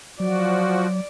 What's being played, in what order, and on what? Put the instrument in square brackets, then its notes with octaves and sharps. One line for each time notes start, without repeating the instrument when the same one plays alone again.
[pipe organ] F3 F#4 [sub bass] F#3 [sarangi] D5